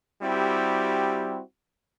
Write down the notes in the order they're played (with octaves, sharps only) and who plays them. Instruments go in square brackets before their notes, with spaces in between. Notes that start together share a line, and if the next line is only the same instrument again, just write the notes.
[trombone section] G3 C4 E4 F#4 G4